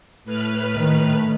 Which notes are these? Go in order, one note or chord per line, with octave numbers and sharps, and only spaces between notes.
A2 B4 F6
A#2 D#3 A3